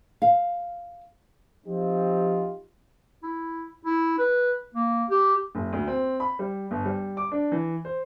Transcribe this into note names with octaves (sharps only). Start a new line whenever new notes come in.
F5
F3 C4 D#4 F4 G4
E4
E4
B4
A#3
G4
F#1
D2
C4
B5
G3
G1
G3
D6
D4
E3
C5